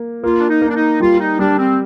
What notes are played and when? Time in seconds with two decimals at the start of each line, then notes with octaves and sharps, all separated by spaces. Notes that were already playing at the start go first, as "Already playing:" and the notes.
Already playing: A#3
0.23 A#3 F4
0.39 D4
0.49 D#4
0.62 A#3
0.69 D4
0.75 D#4
1.00 G3 F4
1.20 D#4
1.39 G3 D4
1.59 C4